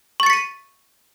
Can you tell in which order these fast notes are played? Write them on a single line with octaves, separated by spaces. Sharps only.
C#6 A6 C#7 B6 D#7